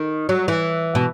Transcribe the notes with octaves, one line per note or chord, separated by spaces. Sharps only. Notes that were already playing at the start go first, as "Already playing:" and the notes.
Already playing: D#3
F#3
E3
B2